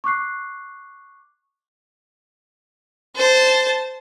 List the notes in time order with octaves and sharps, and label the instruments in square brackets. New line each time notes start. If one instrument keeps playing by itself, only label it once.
[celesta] C#6 D6 F#6 C7
[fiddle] C5 A5